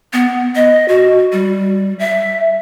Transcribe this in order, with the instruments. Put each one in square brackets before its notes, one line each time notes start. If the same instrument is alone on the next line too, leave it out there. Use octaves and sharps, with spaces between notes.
[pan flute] B3
D#5
F#4
G3
E5